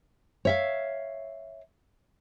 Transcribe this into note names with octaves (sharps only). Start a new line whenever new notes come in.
C#5 E5 F5